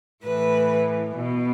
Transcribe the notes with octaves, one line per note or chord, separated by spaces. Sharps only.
A2 E3 B4
B2